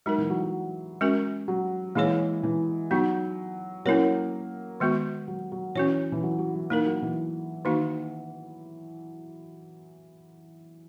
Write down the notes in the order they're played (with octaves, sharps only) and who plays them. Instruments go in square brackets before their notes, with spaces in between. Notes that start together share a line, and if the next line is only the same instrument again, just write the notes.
[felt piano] F#3 [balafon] G#3 D#4 A#4
[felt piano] E3
F#3
F#3
[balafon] G#3 C#4 F#4 A#4
[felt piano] F#3
[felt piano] E3 G#3 [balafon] A#3 E4 G#4 C#5
[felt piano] E3
[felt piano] F#3 [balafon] B3 D#4 F#4
[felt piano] F#3 A#3 [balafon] C#4 E4 A#4 C#5
[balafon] D#3 G#3 B3 F#4
[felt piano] F#3
F#3
[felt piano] E3 [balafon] C#4 F#4 C#5
[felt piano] E3
F#3
F#3
F#3
[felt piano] E3 [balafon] A#3 D#4 A#4
[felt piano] F#3
E3
[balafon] D#3 A#3 D#4 F#4